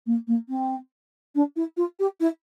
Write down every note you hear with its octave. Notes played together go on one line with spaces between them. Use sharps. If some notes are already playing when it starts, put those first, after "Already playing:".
A#3
A#3
C4
D4
E4
F4
G4
E4